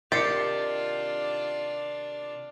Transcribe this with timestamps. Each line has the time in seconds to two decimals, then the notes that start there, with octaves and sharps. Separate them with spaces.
0.12 C3 D#3 D4 F4 G4 A6 C7 C#7